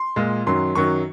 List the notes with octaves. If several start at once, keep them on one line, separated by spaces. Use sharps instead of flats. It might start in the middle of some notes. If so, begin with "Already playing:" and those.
Already playing: C6
A#2 G#3
F#2 D#3 F#3 C6
F#2 D#3 F#3 C#6